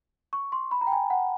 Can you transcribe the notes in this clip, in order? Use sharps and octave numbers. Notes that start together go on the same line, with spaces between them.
C#6
C6
B5
A#5
G5
G#5
F#5